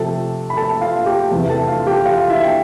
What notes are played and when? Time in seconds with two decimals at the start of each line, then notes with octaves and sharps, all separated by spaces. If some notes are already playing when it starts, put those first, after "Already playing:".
Already playing: C3 F3 A3 A4 A5
0.50 B5
0.57 A4 A5
0.81 F4 F5
1.06 G4 G5
1.31 E2 C3 E3
1.49 A4 A5
1.68 F4 F5
1.87 G4 G5
2.05 F4 F5
2.30 E4 E5
2.43 G5